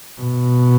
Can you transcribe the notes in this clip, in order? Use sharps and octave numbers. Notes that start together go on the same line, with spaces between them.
B2